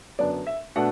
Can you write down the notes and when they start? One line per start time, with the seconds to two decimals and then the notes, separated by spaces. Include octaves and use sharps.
0.19 F#2 D3 B3 D4 D5
0.47 E5
0.76 B2 A3 D4 F#5